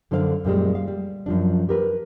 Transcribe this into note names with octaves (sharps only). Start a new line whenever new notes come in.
F#2 D3 D4 A4 C5 F5
F#2 A#2 G3 G#3
F5
G3
F#2 F3 D4
G4 A#4 B4